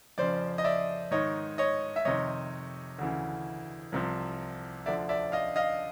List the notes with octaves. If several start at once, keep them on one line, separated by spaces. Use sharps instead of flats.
F2 C#3 F3 C5 D5
D#5
D5 E5
G#2 D#3 C#5 D#5
C#5 D#5
E5
F2 C3 D#3 C#5 D#5
D2 C#3 E3
C2 C3 F3
D2 D3 F3 D5 E5
D5 E5
D#5 F5
D#5 F5